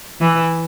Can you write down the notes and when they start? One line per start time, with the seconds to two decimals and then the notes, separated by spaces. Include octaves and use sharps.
0.21 E3